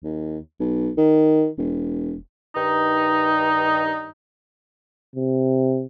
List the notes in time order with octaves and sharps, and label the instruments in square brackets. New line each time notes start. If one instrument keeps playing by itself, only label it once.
[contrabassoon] D#2
B1
D#3
E1
[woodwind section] G2 D#3 D#4
[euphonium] C3